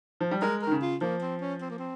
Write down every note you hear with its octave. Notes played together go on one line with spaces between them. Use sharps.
F3
G3
G#3 A#4
D#3 A#4
C#3
F4
F3 A#3
C4
C#4
C4
A#3
C4